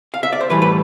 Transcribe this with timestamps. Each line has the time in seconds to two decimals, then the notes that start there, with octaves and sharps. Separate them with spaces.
0.14 F5
0.23 E5
0.32 D5
0.41 C5
0.50 A2 E3 G3 B4
0.62 B4